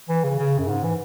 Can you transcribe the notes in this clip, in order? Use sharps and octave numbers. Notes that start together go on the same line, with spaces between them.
E3
C#3
C#3
F#2
G#2
E3